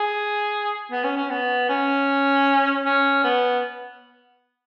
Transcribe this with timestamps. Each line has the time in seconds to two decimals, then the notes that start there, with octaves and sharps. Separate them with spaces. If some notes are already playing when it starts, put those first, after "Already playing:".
Already playing: G#4
0.92 B3
1.04 C#4
1.17 C#4
1.30 B3
1.69 C#4
2.85 C#4
3.24 B3